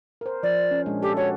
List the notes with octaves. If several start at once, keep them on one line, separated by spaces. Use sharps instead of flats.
A#4 C5
F3 D5
C#4
A#2 G#3 D4
G4 A4 D5
F#4 G4 C#5